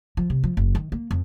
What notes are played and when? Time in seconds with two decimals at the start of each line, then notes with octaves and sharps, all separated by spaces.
0.17 F3
0.30 C3
0.44 F3
0.57 F#1
0.75 D#3
0.92 A#3
1.11 F2